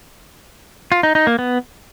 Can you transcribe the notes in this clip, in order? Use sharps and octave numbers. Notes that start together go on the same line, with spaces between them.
F4
D#4
D#4
A#3
B3